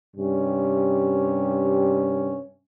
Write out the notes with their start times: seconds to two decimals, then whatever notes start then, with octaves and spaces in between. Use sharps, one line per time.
0.16 G2 C3 C#4